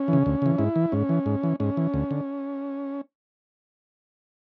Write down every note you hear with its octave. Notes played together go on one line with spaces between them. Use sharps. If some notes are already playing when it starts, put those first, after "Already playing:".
Already playing: C#4
E3
C#3
D2
C#3 E3
G#2 E4
E3
G#2 C#4
E3
G#2
E3
G#2 C#4
E3
D2
D3